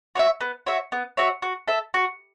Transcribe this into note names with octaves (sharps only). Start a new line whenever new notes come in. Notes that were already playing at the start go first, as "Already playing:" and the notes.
F#4 C#5 E5
B3
F#4 C#5 E5
B3
F#4 C#5 E5
F#4
A4 E5
F#4